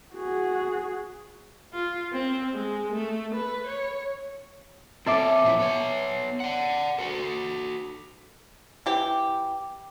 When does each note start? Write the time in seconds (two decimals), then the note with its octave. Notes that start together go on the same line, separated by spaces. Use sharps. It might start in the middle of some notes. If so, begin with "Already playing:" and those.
0.15 F#4 G#4
1.73 F4
2.13 C4
2.54 G#3
2.92 A3
3.34 B4
3.67 C#5
5.06 C4 A4 C#5 E5 D6
5.43 A#2 F3 E4
5.59 B3 C#5
6.40 D5 F#5
6.98 F#4 A4
8.86 E3 G4